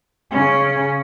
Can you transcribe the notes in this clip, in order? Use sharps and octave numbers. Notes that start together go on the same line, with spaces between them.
C#3 C#4